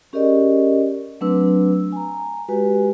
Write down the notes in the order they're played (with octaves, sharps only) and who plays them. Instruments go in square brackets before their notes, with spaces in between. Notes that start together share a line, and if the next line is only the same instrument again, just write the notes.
[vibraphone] C#4 G4 G#4 A#4 D5 D#5
F#3 A3 C4 D4 B4 E6
G#5 A#5
G#3 F#4 G4 B4 G#5